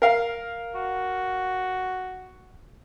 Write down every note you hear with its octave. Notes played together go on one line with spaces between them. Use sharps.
A#4 F5
F#4